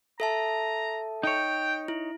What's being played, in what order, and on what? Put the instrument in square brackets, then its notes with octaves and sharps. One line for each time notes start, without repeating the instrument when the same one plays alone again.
[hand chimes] A4 E5 A5 [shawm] A#5
[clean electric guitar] D#4 C#5 [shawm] G5
[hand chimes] E4